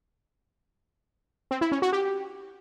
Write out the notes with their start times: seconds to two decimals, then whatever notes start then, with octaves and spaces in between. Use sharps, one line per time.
1.51 C4
1.61 E4
1.72 C#4
1.82 F#4
1.92 G4